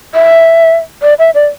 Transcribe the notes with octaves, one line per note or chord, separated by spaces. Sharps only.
E5
D5
E5
D5